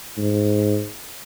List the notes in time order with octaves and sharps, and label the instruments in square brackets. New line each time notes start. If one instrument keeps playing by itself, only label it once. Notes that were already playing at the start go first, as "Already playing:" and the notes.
[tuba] G#2